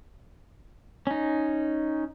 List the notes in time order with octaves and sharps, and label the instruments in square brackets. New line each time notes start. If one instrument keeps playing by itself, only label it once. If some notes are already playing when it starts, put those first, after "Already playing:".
[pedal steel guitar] C#4 D#4